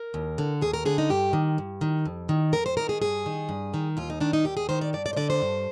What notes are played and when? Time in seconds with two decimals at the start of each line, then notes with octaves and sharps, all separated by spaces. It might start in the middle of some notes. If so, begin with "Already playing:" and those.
Already playing: A#4
0.14 D#2
0.38 D3
0.61 D#2 G#4
0.74 A#4
0.85 D3 G#4
0.98 D#4
1.09 G2 G4
1.33 D#3
1.58 G2
1.81 D#3
2.05 F2
2.29 D#3
2.53 F2 A#4
2.66 C5
2.77 D#3 A#4
2.89 G#4
3.02 G2 G#4
3.26 D#3
3.49 G2
3.74 D#3
3.97 D#2 F4
4.10 D#4
4.21 D#3 D4
4.33 D#4
4.45 D#2 G4
4.57 G#4
4.69 D#3 C5
4.81 D5
4.93 G2 D5
5.06 D5
5.13 C5
5.17 D3 D5
5.30 C5
5.42 G2